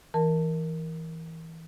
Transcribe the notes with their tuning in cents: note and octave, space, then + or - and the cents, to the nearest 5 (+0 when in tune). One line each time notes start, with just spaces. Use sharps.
E3 -15 A#4 +0 A5 +10